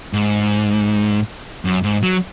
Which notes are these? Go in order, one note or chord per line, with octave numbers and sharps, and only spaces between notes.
G#2
F#2
G#2
F#3